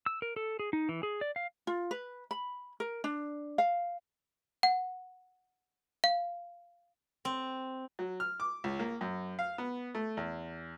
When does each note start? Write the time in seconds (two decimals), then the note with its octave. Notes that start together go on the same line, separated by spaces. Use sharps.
0.06 E6
0.22 A#4
0.36 A4
0.59 G#4
0.73 D#4
0.89 E3
1.03 G#4
1.21 D5
1.36 F5
1.67 F4
1.91 B4
2.31 B5
2.80 A#4
3.04 D4
3.58 F5
4.63 F#5
6.04 F5
7.25 C4
7.99 F#3
8.20 F6
8.40 D6
8.64 C#2
8.79 A#3
9.01 F#2
9.39 F5
9.58 B3
9.95 A3
10.17 E2